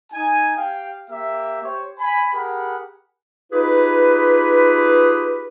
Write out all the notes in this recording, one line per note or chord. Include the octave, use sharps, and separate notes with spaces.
D#4 G#5
G4 F5 G5
A#3 G4 E5
G4 C5 C#5
G#5 B5
G4 G#4 A#4 F#5 B5
D#4 F4 G4 G#4 B4